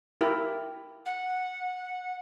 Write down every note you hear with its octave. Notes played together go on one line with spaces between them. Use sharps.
E4 G4 A#4
F#5